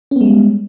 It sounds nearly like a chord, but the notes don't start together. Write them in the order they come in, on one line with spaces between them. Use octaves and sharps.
C#4 B3 G#3 G3